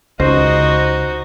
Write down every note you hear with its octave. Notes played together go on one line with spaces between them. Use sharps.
C#2 D#4 F#4 C5 D#5